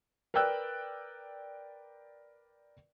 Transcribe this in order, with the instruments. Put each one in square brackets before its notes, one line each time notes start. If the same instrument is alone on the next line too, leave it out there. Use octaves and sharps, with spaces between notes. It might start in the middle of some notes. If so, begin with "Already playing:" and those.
[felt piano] A#4 B4 D5 G5 E6 F#6